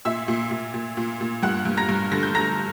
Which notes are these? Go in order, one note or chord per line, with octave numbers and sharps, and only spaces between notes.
A#2 E5 E6
A#2
A#2
A#2
A#2
A#2
G2 F#5 F#6
G2
A#5 A#6
G2
D3 A#6
G6
D3 A#5 A#6